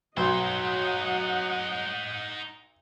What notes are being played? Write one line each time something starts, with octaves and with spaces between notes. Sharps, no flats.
B1 F#3 D#4 C5 D#5 F#5